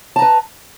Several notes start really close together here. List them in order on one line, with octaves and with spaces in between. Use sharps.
A5 A#5 B4